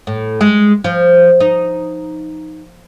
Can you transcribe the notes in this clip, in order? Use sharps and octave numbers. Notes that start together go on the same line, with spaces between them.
A2
G#3
F3
D#4